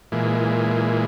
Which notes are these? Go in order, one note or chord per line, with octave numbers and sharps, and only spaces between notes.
A#2 E3 G#3